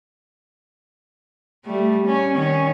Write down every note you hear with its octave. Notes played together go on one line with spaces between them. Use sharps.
G3 A3
C#4
D#3 C#4